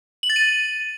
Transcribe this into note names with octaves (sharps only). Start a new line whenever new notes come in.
F#7
A6
D#7